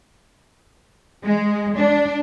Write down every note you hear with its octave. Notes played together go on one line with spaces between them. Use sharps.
G#3
D4